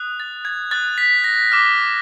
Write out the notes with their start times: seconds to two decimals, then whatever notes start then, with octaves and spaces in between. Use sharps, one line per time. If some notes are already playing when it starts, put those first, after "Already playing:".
Already playing: D#6 F#6
0.20 A6
0.45 G#6
0.71 D#6 F#6 A6
0.98 B6
1.24 A#6
1.52 D6 F6